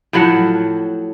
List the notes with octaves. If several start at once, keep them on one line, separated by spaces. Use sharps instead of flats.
A2 F3 F#3 F#5